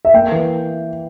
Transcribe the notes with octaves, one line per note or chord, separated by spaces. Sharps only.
E5
A#3 G5
E3